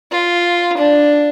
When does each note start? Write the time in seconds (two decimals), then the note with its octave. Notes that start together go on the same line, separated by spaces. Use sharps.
0.11 F4
0.77 D4